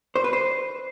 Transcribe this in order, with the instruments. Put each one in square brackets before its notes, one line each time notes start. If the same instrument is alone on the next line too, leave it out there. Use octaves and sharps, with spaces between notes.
[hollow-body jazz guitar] C5
B4
C5